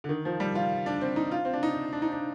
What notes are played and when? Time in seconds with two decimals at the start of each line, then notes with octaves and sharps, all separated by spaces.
0.04 D3
0.09 D#3
0.25 F3
0.40 G3
0.55 F4
0.86 D4
1.01 C4
1.16 D#4
1.31 F4
1.45 C4
1.53 D4
1.63 D#4
1.93 D4
2.02 D#4
2.12 D4